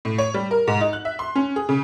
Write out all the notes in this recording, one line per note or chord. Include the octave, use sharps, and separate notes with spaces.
A2
C#5
G3
A#4
G#2
D#4
F#6
E5
C6
C#4
G#4
C#3